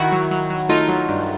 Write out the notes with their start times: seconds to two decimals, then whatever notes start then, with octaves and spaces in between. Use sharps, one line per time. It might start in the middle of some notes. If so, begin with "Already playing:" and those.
Already playing: D#3 E4 F#4
0.12 F#3
0.31 F#3
0.50 F#3
0.69 A3 D#4 F4
0.88 F#3
1.09 G2